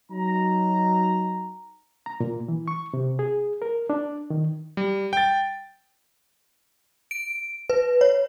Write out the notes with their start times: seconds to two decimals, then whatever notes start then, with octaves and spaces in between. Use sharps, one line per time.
0.11 F#3 D#4 A#5
2.06 A#5
2.20 A#2
2.48 E3
2.68 C#6
2.94 C3
3.19 G#4
3.62 A#4
3.90 D4
4.30 D#3
4.77 G3
5.13 G5 A6
7.11 D7
7.70 B4
8.01 C#5